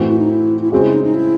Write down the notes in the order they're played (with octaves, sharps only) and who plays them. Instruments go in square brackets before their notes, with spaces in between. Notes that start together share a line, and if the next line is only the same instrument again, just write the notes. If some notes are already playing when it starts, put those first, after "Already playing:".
Already playing: [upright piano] A2 E3 C4 F#4
[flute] E4
D#4
E4
E4
[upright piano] C#3 G#3 C4 [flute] F#4
[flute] E4
D#4
D#4
E4